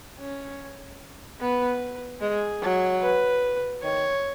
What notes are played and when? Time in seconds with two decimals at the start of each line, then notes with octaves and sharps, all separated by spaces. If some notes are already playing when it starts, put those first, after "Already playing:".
0.19 C#4
1.40 B3 B4
2.21 G#3 G#4
2.62 F#3
3.02 B4
3.83 D#3 C#5